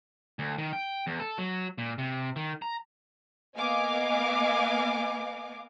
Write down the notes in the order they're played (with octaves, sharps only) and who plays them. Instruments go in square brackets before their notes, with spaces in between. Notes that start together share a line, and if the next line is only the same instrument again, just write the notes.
[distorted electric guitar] D2
D#3
G5
E2
A4
F#3
A#2
C3
D#3
A#5
[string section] A#3 B3 D#5 F5 G#5 D6